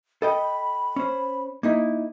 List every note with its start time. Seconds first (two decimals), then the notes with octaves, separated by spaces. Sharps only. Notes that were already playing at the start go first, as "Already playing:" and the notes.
0.22 A4 D#5 G5 B5
0.96 C#4 C5
1.63 A#3 D#4 E4